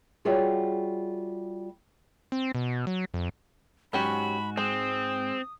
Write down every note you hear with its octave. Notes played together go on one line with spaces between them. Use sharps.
G3 F4 F#4 G#4 C#5 E5
C4
B2
F#3
F2
G#2 F#3 C#4 F#4 G4 B5
G#3 C4 D#6